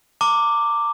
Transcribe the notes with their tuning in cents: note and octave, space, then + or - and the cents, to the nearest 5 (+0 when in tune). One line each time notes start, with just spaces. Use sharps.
A#5 -35 D6 +0